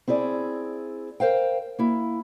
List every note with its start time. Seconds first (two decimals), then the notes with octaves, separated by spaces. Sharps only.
0.08 C4 E4 G#4 D5
1.20 A#4 C5 F5 G5
1.79 A#3 E4